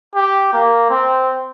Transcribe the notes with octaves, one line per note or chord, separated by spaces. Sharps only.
G4
A#3
C4